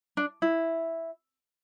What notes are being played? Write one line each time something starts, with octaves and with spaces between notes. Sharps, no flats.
D4
E4